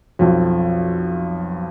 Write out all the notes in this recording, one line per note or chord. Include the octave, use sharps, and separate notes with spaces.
B1 F2